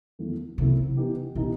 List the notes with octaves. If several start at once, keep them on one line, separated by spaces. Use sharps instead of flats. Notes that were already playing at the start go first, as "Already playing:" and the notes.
E2 D#3 F#3 A3 E4
E2 C3 D#3 F#3 A3 E4
E3 B3 D#4 G4
B2 E3 B3 D#4 G4